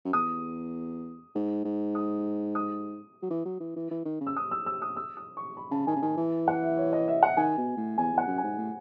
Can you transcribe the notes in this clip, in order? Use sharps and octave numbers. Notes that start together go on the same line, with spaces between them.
F#2
E2 D#6
G#2
G#2
D#6
D#6
F#3
E3
F#3
E3
E3
E3
D#3
C#3
E6
D#6
E6
E6
D#6
E6
D#6
C#6
B5
C#3 A5
D#3 G#5
C#3
D#3 G#5
E3
F#5
E5
C#5
D#5
E5
F#5
D#3 G#5
B2
A2
E2 G#5
E2 F#5
F#2
G#5
G#2
A2